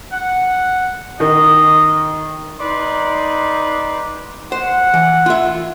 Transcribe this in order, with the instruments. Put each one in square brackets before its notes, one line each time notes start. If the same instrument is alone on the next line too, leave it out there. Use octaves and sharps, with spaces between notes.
[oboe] F#5
[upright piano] D#3 [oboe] D#5
[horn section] D#4 B4 D5 C6
[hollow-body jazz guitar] C5 [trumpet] F#5
[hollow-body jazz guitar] E3
F4 E5